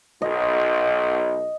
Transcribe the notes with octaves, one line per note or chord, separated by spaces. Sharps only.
B1 D#5